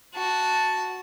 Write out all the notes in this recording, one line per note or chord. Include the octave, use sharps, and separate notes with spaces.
F#4 A5